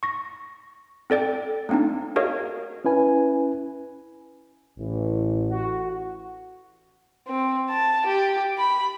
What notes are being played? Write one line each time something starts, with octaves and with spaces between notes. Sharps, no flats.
C#6 A#6
C4 A4 D5 G5
A3 A#3 C4 D4 D#4
F#4 G#4 A#4 C#5 D#5 F5
C#4 E4 B4 G#5
A1 E3
F#4
C4
A5
G4
B5